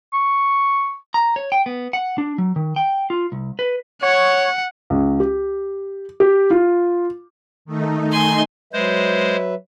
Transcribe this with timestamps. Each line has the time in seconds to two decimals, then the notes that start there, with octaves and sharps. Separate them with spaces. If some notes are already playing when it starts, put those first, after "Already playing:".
0.13 C#6
1.14 A#5
1.36 C#5
1.52 G5
1.66 B3
1.93 F#5
2.18 D4
2.38 F#3
2.56 D#3
2.76 G5
3.10 F4
3.32 C2
3.59 B4
4.02 C#5 F#5
4.90 C#2
5.20 G4
6.20 G4
6.50 F4
7.65 D#3 A3 D#4
8.12 G#5 C6
8.73 F#3 G#3 B4 C5 E5